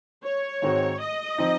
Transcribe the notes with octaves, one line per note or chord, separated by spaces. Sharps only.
C#5
G#2 D#3 G#3 C4 F#4
D#5
F3 C4 D#4